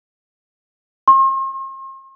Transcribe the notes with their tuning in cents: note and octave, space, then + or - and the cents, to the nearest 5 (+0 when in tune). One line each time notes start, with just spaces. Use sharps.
C6 +45